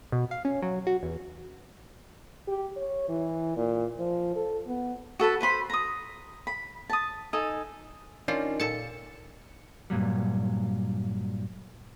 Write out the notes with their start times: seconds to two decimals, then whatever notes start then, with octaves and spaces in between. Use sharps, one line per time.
0.12 B2
0.31 F5
0.45 C#4
0.62 F#3
0.87 F#4
1.03 E2
2.48 G4
2.76 C#5
3.08 E3
3.57 A#2
3.99 F3
4.36 A4
4.67 B3
5.19 F#4 A4 B4 A5
5.41 B4 C5 B5 C6
5.70 A#5 D#6
6.47 B5
6.90 A5 D#6
7.33 D#4 A4 G#5
8.28 D#3 C#4 D4 F4 D5
8.60 A#2 A4 A5 C#7
9.90 G2 A#2 F#3 G3